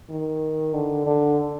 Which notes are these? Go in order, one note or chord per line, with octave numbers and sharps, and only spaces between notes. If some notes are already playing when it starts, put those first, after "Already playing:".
D#3
D3
D3